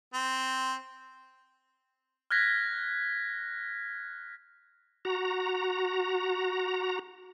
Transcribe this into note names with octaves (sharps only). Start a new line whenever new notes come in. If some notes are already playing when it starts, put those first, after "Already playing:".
C4
F6 F#6 G#6 A#6 B6
F#4 A#5